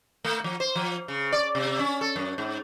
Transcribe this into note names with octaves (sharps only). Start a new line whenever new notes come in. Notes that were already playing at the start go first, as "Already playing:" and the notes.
A3
F3
C5
F3
C#3
D5
C3
C#4
A4
F#2
G#2